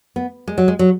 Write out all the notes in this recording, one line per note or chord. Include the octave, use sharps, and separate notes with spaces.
B3
G#3
F#3
G#3
F#3